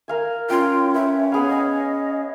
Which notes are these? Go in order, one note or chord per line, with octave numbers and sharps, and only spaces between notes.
A#4 F5 G#5
C#4 F4 G5
B4 E5
B3 G#4 F5 B5
D#5 G#5